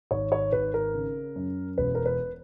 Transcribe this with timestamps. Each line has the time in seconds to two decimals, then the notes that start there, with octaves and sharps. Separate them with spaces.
0.11 G#1 C#5
0.32 C#5
0.52 G#1 B4
0.74 A#4
0.94 C#3
1.36 F#2
1.78 E1 B4
1.95 A#4
2.06 B4